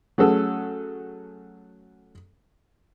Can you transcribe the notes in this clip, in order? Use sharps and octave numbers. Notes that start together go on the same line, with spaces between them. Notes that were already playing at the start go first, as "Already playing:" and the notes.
F#3 A3 C#4 G#4 A4